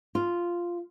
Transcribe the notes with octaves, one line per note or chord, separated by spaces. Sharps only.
F4